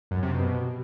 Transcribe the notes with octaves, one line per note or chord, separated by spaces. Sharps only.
F#2
C3
B2